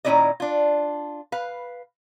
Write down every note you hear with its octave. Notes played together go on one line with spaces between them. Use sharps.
A#2 D#3 C#4 E4 D5 D#5
D4 F4
B4 F5